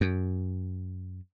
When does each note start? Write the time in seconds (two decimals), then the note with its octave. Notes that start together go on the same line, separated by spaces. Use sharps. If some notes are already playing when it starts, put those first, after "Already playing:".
0.01 F#2